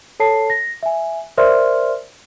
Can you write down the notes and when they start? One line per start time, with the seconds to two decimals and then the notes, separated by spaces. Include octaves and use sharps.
0.20 A4 C#5 A5 C7
0.50 A#6
0.83 E5 G#5
1.37 A#4 C5 D5 E5 C6 F6